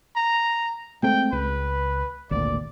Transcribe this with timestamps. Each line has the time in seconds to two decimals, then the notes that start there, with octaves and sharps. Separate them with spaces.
0.16 A#5
1.03 G#3 A3 C4 G5
1.32 C#2 B4
2.31 G#1 D2 A#2 D5